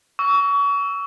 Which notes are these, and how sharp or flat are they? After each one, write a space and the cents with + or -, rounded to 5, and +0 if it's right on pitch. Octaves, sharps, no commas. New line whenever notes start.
C#6 +35 E6 +0